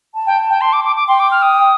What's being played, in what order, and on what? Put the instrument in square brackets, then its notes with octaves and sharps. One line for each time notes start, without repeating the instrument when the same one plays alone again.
[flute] A5
[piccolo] G5
G5
C6
D6
D6
D6
[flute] G5 [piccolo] C6
[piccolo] D6
F6
D#6